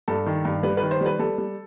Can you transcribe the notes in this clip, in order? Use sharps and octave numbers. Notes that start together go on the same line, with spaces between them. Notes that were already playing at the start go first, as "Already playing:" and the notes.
G2 A4
D#3
G2
G3 B4
B4
D#3
C5
G3
B4
G3 A4
G3